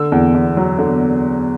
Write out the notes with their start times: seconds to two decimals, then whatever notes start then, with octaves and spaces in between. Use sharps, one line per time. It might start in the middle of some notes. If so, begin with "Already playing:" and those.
Already playing: D3 E6
0.12 E2
0.34 E2
0.57 F#3
0.79 D3